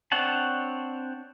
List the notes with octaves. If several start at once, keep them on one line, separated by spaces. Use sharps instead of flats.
C4 D4 C#5 F#5 A5